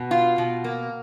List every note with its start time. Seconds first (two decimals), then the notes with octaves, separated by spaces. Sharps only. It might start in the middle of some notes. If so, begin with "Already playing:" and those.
Already playing: B2
0.11 F4
0.38 B2
0.64 A#3